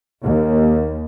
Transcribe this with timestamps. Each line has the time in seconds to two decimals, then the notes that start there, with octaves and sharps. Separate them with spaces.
0.24 D#2